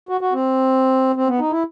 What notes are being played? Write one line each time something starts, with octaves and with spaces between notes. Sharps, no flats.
F#4
F#4
C4
C4
B3
D#4
E4